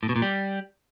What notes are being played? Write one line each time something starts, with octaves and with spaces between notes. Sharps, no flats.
A2
B2
A#2
G3